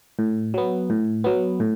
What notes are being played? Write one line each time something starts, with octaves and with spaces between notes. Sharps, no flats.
A2
F#3 B3
A2
F#3 B3
A2